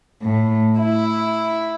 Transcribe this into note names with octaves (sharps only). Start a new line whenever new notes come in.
A2
E4